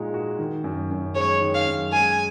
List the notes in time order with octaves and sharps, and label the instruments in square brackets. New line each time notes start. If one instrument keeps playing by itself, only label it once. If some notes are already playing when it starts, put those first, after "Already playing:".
Already playing: [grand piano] A#2 G#3 D#4 F#4
F#4
D#3
F#2
F#2
[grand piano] G#3 [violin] C#5
[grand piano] D#3
[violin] F5
[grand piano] F#2
[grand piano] G#3 [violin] G#5